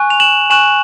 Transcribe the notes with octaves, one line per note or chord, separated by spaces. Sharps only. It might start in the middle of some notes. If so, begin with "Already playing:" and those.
Already playing: G#5 C#6 F#6
F7
E7 F#7
G#5 C#6 F#6 E7 F#7